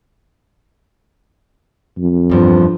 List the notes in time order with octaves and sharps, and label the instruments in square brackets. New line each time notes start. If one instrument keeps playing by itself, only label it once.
[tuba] F2
[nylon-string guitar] E2 G2 F3